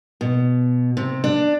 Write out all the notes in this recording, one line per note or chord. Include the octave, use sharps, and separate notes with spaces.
B2
C3
D4